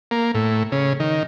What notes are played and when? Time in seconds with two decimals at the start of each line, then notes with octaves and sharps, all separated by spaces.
0.11 A#3
0.34 A2
0.72 C#3
1.00 D#3